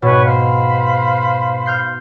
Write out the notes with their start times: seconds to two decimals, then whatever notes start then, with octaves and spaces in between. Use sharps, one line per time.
0.02 G#2 B2 B4 C#5
0.25 C5 F5 B5
1.66 F6 G6 C7